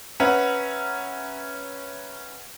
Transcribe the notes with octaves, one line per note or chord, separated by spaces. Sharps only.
C#4 B4 E5 F#5 A#5